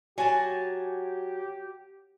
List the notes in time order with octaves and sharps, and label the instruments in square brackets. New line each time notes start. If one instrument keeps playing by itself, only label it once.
[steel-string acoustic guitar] F#3 [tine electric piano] F#4 [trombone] G4 [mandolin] G#5 A5